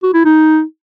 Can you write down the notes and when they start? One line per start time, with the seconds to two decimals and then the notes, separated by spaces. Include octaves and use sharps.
0.03 F#4
0.14 E4
0.25 D#4